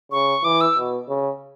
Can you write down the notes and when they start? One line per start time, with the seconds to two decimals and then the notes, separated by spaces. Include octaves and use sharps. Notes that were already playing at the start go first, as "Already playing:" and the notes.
0.12 C#3 C#6
0.44 E3 D6
0.61 E6
0.77 B2
1.08 C#3